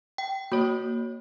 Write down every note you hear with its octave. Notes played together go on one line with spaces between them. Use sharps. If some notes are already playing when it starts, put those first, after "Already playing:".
G5
A#3 F#4 C#5